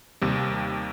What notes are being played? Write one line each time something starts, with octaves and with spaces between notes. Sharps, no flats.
D#2 C3 G3